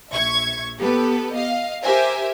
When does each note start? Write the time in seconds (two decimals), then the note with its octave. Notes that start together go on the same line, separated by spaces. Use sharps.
0.12 A#1 E5 C#6 G#6
0.78 B3 G4 A4 B4
1.33 D#5 F5
1.83 G4 A#4 C5 E5 G#5